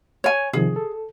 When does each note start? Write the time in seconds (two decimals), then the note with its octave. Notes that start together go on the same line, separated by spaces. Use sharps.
0.24 C#5 G#5
0.53 C3 D#3 F3 G#4
0.76 A4